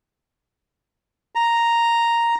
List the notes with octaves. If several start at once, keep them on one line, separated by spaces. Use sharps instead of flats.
A#5